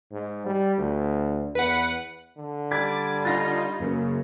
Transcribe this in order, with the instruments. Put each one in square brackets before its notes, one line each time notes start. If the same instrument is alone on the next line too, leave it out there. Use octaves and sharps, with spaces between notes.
[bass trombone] G#2
G3
D2
[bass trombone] E2 [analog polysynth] B4 F#5
[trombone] D3
[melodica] G3 [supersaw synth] D6 A6 [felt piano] G#6 B6
[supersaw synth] D#4 F4 [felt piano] A6 A#6
[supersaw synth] F#2 C#3 [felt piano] A#3 A#4